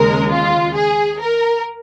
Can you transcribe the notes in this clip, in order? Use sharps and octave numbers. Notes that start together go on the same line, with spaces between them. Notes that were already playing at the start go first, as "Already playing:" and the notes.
Already playing: D#2 C#3 G#3 A#4
F4
G#4
A#4